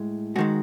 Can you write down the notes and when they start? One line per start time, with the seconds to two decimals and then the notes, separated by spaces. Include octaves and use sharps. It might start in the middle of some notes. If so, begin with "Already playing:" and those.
Already playing: A2 G#3
0.36 G#2 D#3 G#3 F#4